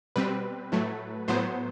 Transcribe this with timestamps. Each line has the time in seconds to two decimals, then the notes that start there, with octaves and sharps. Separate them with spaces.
0.16 B2 G3 C4 B4
0.72 A2 F#3 A3
1.28 A2 F#3 B3 C5